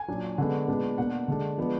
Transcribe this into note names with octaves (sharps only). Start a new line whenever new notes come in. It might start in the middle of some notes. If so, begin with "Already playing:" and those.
Already playing: G#5
A#2 F#3 D4
D3 G#3 B3 D4 F#5
A#2 G#3 B3 D4
B2 A#3 D4 F#5
D3 G#3 D4
F3 G#3 B3 D4